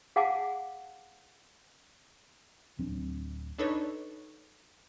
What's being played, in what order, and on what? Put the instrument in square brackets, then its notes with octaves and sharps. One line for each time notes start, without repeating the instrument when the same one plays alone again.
[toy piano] G#4 F5 F#5 G#5 A5 D6
[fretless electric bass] D1 F#3 C4 D4
[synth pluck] D4 D#4 A4 B4 C#5